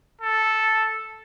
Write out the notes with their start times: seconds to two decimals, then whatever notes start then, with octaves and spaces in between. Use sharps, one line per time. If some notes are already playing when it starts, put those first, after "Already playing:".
0.21 A4